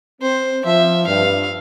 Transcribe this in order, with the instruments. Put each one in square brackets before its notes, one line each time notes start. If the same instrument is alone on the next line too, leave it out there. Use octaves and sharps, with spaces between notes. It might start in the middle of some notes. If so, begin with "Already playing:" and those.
[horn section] C4 [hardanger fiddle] C5
[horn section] F3 [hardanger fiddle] E5
[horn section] G2 [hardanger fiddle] F5